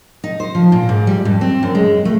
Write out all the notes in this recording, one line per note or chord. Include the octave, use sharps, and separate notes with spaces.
D#4
C5
F3
A#2
G#2
G3
F2
C4
F#2
G#3
A3